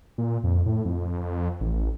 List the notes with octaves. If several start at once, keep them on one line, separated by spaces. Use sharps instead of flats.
A#2
F2
A2
F2
A1